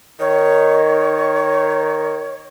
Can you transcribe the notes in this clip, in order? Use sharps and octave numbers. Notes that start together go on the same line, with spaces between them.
D#3 C#5